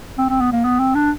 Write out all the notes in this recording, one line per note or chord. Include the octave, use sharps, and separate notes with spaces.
C4
C4
B3
A#3
B3
C4
D4